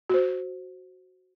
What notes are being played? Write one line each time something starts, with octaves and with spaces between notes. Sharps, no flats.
F#4 C5